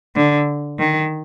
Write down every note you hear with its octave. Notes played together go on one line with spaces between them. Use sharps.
D3
D#3